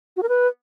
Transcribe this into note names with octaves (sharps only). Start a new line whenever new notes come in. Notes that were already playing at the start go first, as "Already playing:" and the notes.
F#4
A#4
B4